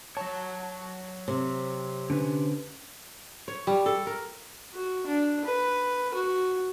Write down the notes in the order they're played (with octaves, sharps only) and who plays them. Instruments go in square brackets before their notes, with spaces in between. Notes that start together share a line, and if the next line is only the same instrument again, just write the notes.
[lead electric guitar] F#3 C#5 [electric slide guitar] A5
[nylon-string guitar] C3
[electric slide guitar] D3 C#4 B4
[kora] C#5
G3
A4
A#4
[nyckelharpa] F#4
D4
B4
F#4